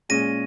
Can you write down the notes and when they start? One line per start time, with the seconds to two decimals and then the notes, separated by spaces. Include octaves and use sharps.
0.09 A#2 G#3 C#4 G#4 A#6 D#7